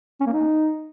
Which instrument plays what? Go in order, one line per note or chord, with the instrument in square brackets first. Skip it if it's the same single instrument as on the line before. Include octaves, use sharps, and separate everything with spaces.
[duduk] C#4
A#3
D#4